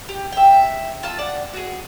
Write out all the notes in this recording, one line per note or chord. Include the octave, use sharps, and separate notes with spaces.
G4
E5 G5
F4 A5 E6
D5 F#5
F#4 G#4